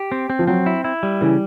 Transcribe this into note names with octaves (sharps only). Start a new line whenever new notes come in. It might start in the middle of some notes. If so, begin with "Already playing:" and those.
Already playing: G4
C4
C4
F3
F#3 C4
E4
E4
G3
C#3 E3